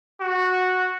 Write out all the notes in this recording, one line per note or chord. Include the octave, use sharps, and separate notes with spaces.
F#4